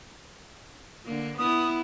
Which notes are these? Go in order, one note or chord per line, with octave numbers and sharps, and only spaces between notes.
D3 A#3
B3 E4 D#6